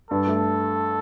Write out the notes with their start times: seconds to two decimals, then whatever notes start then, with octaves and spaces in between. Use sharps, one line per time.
0.11 G2 A4
0.27 A3